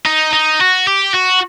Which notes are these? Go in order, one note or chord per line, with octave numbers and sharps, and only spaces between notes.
D#4
D#4
F#4
G4
F#4